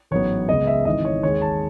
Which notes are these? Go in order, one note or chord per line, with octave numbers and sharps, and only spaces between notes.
A1 G#2 F#3 B3 C#5
C#2 C#3 G#3 B3 D#5
E5
G#1 G#2 E3 D#5
C#5
D#2 D#3 G#3 C#5
A5